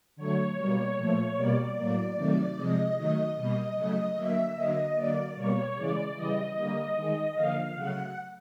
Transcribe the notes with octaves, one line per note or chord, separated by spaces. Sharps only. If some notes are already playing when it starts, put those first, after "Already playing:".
D3 F#3 A3 C#5
B2 G3 A#3
A#2 F3 A3
B2 G3 A#3 D5
A2 F#3 A#3
C3 D#3 F#3 A3
C3 F3 G#3 D#5
D#3 F#3 A3 D#5
B2 G3 A#3 D#5
C#3 F#3 A3 D#5
D3 F#3 A#3 E5
D3 F#3 A#3 D#5
D3 F#3 A#3 D5
B2 G3 A#3 C#5
C#3 E3 G#3 D5
C#3 E3 G3 D#5
D3 G3 A#3
D#3 G#3
D3 F3 A#3 F5
C#3 F#3 A3 F#5